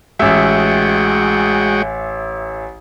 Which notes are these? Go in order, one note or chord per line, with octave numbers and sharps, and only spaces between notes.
A1 G#3 F#4 E5 G5